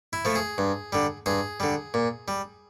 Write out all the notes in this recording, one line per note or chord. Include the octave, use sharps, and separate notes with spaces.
E4
F3 A3
G#4
G2
D3 G3
G2 G#4
D3 G3
A#2
G3